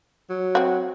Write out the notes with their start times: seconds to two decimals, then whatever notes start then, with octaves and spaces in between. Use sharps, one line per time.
0.30 F#3
0.55 C4 F#4